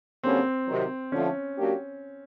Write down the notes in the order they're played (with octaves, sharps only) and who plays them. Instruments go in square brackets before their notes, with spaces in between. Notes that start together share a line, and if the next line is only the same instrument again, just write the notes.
[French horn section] F#2 D3 G3 A#3 C#4 [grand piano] C4
[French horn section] C3 D#3 F#3
[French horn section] D3 F3 A3 [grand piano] C#4
[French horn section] F#3 A#3 D4 G4